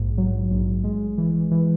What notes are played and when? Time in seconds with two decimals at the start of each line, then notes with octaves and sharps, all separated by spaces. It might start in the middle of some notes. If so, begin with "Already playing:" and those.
Already playing: A#1 G#2
0.18 F#3
0.51 A#1
0.84 G#3
1.18 E3
1.51 E3